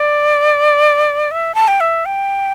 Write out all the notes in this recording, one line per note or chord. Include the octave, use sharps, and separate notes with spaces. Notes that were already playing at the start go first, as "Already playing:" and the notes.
Already playing: D5
E5
A5
G5
E5
G5